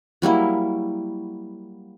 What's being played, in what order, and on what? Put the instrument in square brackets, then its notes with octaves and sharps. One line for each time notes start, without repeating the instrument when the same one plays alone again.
[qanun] F#3 G3 A#3 E4